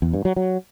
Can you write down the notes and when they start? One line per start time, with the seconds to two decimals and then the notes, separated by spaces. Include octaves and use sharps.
0.02 E2
0.14 G2
0.25 F#3
0.36 F#3